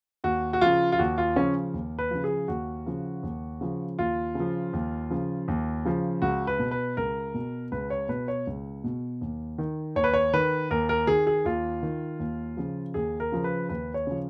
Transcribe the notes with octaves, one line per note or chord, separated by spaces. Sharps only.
D#2 F#4
F#4
C#3 F3 F4
F4
D#2 F#4
F4
C#3 F3 C#4
D#2
B4
C#3 F3
G#4
D#2 F#4
C#3 F3
D#2
C#3 F3
D#2 F4
C#3
F3
D#2
C#3 F3
D#2
C#3 F3
C#2 F#4
B4
B2
B4
C#2 A#4
B2
C#2 B4
C#5
B2 B4
C#5
C#2
B2
D#2
D#3
D#2 C#5
B4
C#5
D#3 B4
D#2 A#4
A#4
D#3 G#4
G#4
D#2 F4
D#3
D#2
C#3 F3
D#2 G#4
A#4
C#3 F3
B4
D#2 B4
C#5
C#3 F3